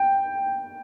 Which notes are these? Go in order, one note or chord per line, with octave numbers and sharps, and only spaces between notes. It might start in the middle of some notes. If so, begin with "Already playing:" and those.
Already playing: G5